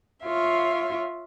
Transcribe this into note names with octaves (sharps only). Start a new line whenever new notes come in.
F4 C#5 E5 F5